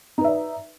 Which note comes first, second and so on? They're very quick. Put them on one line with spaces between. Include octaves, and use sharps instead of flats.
D#4 B4 E5 D5